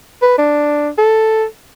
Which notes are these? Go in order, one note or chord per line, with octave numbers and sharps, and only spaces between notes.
B4
D4
A4